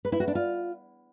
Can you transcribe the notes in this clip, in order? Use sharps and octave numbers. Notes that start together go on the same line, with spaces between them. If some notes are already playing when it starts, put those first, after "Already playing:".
B4
E4
F#4
D4
F4